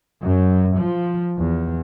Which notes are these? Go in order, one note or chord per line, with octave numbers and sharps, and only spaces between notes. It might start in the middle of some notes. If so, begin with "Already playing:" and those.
F#2
F3
E2